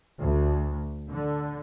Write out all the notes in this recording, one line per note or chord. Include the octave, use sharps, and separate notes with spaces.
D2
D3